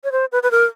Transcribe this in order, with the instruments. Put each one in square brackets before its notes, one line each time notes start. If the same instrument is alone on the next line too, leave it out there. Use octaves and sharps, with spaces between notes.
[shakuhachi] C#5
C5
B4
B4
A#4